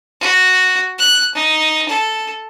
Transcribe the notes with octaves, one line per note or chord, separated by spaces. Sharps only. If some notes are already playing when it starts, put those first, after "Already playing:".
F#4
F#6
D#4
A4